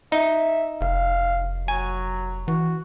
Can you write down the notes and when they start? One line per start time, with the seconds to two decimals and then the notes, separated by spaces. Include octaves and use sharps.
0.12 D#4 E5
0.81 F1 F5
1.68 F#3 G#5
2.48 E3 F#4